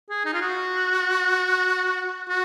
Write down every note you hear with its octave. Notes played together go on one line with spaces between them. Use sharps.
G#4
D#4
F4
F#4
F#4